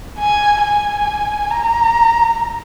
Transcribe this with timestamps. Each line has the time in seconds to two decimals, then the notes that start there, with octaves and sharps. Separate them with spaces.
0.19 G#5
0.63 G#5
1.51 A#5